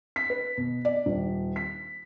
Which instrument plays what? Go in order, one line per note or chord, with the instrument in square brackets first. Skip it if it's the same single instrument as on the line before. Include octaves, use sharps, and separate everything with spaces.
[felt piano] B6
B4
B2
D5
D#1
B6